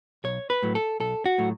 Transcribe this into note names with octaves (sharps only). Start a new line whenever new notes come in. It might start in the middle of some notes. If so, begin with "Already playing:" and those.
B1 C#5
B4
A2 F#3 A3
A4
B1 A4
F#4
A2 F#3 A3